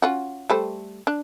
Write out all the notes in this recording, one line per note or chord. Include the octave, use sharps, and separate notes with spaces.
C#4 F4 F#4
G3 A3 C5
D4